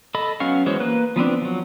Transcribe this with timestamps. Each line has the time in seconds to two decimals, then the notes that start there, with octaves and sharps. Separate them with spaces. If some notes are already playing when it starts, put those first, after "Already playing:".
0.14 A4 D#5 B5
0.40 F#3 B3 C#4 F5 C#6
0.66 E3 G#3 F#4 C5 C#5
0.80 A#3 B4 F#6
1.16 F3 B3 C4 D4
1.42 F3 F#3